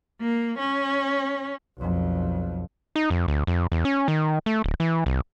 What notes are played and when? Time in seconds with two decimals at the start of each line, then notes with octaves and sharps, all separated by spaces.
0.21 A#3
0.58 C#4
1.77 B1 F2
2.96 D#4
3.10 F2
3.28 D2
3.47 F2
3.72 E2
3.85 C#4
4.08 D#3
4.46 A3
4.64 D1
4.80 E3
5.06 C2